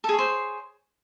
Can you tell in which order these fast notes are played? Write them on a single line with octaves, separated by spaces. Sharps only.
A4 G#4 C#5 C5